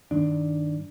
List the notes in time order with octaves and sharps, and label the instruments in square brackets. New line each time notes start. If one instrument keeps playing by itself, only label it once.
[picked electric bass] G2 D#3 D4